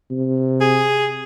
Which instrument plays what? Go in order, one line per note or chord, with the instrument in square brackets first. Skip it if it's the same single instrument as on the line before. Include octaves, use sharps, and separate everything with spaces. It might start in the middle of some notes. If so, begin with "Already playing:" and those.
[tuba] C3
[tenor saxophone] G#4